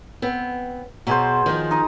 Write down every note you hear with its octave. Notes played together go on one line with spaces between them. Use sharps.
B3 C4
B2 F#3 G#4 C5
D#3 F3
D#4 D#6